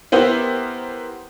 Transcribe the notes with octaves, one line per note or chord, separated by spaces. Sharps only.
B3 E4 G4 A#4 C5